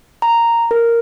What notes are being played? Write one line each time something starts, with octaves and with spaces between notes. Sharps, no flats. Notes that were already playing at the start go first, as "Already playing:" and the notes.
A#5
A#4